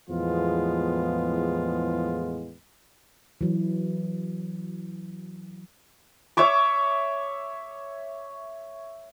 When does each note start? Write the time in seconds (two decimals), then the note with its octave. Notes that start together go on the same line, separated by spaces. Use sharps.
0.10 E2 A2 F3 G#3 B3 F4
3.41 E3 F#3
6.37 C#5 E5 C#6 D6